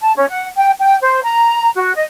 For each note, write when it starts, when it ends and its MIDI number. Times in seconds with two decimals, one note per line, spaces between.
0.02 0.12 81
0.16 0.26 61
0.29 0.47 78
0.58 0.71 79
0.80 0.97 79
1.02 1.20 72
1.24 1.70 82
1.75 1.94 66
1.95 2.04 75